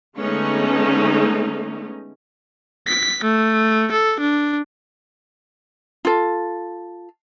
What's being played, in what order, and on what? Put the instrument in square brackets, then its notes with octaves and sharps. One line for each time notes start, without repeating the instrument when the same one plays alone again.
[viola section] D3 G#3 A3 B3 C#4 D#4
[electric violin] B6
A3
A4
D4
[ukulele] F4 A4